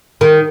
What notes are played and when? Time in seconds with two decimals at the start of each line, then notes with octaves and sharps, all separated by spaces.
0.21 D#3